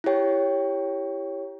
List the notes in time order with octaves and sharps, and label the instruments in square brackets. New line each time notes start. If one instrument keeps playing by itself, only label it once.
[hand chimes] E4 G4 C#5 G5